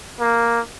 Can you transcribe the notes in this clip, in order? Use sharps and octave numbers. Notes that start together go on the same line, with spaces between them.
A#3